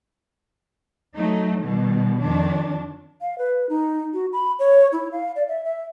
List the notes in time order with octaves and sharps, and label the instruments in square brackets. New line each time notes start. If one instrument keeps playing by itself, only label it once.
[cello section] F#3 A3 D#4
B2 D#3 G3
F2 D#3 D4
[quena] F5
B4
D#4
F#4
B5
C#5
E4
F5
D5
E5
E5